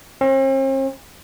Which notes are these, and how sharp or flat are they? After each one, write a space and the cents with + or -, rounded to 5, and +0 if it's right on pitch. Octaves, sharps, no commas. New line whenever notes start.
C4 +45